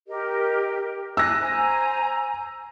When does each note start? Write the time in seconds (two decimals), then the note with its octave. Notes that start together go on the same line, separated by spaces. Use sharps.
0.08 G4 A#4 D#5
1.17 G#5 E6 F#6 A#6
1.39 C5 G#5 A#5